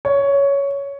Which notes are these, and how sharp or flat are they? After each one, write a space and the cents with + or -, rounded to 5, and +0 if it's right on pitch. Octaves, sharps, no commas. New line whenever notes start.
C#5 +10